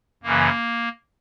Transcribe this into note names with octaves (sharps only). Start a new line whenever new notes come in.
F#2 C#3 E3 A#3